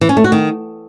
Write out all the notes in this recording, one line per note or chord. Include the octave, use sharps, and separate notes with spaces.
E3
C#4
A3
F#4
D#3